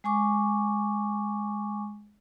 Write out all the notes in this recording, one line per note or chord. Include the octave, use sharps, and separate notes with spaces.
G#3 G#5 C#6 D6